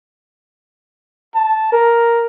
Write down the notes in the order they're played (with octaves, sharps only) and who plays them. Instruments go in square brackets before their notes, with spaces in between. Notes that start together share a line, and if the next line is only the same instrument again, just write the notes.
[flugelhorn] A5
A#4